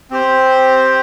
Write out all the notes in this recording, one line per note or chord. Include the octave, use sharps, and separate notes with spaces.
C4 G4 C5